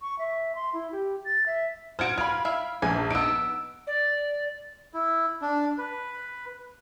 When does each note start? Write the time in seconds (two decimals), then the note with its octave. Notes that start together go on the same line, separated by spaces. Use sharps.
0.01 C#6
0.19 E5
0.55 C6
0.73 E4
0.92 G4
1.25 A6
1.46 E5
1.99 F#4 C5 F6 G#6 D7
2.18 F4 B5 F6
2.45 E4 E5 F5
2.82 A#1 G#5
3.11 B3 D#4 E6 D7
3.87 D5
4.94 E4
5.42 D4
5.78 B4